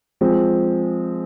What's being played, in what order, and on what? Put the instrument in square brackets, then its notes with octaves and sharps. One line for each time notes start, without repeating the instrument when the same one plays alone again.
[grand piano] F3 G#3 C4